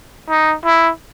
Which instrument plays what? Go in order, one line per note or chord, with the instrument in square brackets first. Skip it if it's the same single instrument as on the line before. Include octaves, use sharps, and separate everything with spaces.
[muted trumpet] D#4
E4